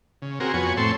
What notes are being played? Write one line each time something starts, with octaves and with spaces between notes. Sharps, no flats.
C#3
C4 F#4 G#4 A#4
F2 B3 F#4 C#5 G#5
A2 C4 A4 C#5 C6